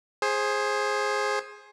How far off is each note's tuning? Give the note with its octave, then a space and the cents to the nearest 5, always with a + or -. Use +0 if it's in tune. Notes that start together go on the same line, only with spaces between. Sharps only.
G#4 +0 C5 +20